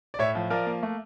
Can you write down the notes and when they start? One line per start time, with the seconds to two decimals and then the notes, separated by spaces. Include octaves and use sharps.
0.14 D5
0.19 A2 C#5 E5
0.35 F3
0.50 F3 A#4 D5
0.66 A#3
0.83 A3